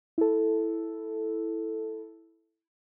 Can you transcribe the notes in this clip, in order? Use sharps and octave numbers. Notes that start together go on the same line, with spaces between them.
E4 A4